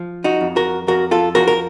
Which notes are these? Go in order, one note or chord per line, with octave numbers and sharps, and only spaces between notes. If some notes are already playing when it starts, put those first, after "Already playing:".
Already playing: F3
D#4 F#4
F2
F#4 A#4
F2 F#4 A#4
F4 A4
F3 F#4 A#4
A#4